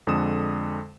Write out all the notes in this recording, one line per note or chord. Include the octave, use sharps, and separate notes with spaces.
F2 D3 G#3 A4 D#6 E7